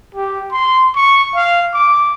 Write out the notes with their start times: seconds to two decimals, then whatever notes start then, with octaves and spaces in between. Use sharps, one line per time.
0.15 G4
0.52 C6
0.96 C#6
1.35 F5
1.74 D6